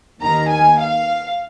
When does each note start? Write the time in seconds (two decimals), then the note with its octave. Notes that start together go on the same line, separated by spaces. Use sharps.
0.21 D#2 D#3 A#3 D#4 A#5
0.50 G#5
0.80 F5